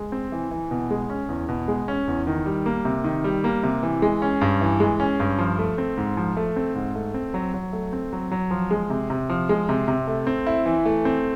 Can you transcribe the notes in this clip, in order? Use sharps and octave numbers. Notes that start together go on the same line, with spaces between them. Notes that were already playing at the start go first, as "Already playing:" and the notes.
Already playing: G#3
C4
E3
E3
B2
G#3
C#4
E2
B2
G#3
C#4
E2
D#3
G3
A#3
C3
D#3
G3
A#3
C3
E3
G#3
C#4
G2
E3
G#3
C#4
G2
F3
A3
C4
G#2
F3
A3
C4
G#2
A3
C4
F#3
F#3
A3
C4
F#3
F#3
F3
G#3
C3
C3
F3
G#3
C3
C3
A3
C4
E4
E3
A3
C4